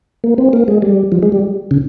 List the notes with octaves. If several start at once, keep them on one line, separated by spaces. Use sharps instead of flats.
A#3
C4
A#3
G#3
G3
F3
G#3
G3
C#3